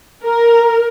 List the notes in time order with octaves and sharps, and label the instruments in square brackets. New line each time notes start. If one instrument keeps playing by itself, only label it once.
[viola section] A#4